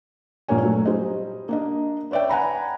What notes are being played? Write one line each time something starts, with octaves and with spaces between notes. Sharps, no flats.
A#1 G2 A#3 C#5 G#5
F#3 A3
G3 C5 D#5
A#3 D4 D#5
B4 C#5 D5 E5 G5
F#5 G#5 A#5 B5